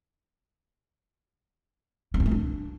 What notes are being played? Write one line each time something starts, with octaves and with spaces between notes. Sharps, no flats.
C4
D3
A3
D4